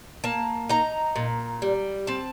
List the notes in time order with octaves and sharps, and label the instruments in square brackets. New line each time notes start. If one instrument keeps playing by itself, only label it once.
[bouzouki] A#3 A5
D#4 A#5
A#2
G3
C4 A5